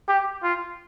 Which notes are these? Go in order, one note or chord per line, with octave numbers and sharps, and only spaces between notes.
G4
F4